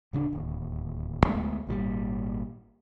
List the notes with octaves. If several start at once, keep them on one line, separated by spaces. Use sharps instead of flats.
D1 C#3 C#4 D4
D1 D#2
D2 G#3 A3 B3
G#1 A#2 F3 G3